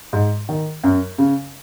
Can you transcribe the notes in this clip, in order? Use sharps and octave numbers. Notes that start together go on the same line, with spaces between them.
G#2
D#3
F#2
C#3